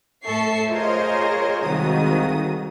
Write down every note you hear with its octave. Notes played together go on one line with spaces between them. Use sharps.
A2 A4 E5 C#6 C7
F4 G#4 A#4 C5 C#5 D#5
C2 F2 G#2 D#3 F#4 D#6